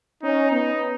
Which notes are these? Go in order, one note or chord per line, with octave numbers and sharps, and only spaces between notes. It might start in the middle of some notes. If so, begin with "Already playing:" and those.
C#4 D#4
B3 D#4